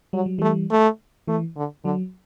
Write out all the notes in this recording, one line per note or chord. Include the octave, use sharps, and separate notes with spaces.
F#3 G3
F#3
E3 G3 A3
A3
E3 A3
D3
D3 F#3